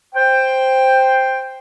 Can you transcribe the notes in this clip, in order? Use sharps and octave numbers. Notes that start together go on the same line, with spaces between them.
C5 G5